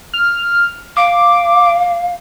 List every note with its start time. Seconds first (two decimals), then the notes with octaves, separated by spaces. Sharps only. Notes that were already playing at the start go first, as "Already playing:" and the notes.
0.14 F6
0.97 F5 D6